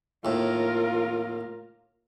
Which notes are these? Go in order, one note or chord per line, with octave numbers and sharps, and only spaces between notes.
D#2 A2 F4 A#4